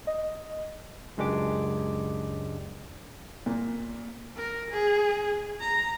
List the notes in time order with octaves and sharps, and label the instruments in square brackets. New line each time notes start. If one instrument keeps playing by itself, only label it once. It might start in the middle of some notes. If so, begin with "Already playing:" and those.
[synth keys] D#5
[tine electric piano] C#2 F#2 G#3 D4 G4 D6
[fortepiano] A#2
[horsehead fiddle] A#4
G#4
A#5